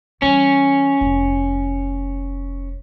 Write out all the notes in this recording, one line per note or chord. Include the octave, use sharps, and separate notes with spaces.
E3 G3 C#4
F1